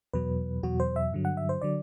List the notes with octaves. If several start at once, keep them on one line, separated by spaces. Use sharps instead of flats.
E2 B2 F#3 B4
E2 B2 F#3 F#4
C5
E5
G2 D3 F#3
F#5
E5
C5
D3 F#3 D5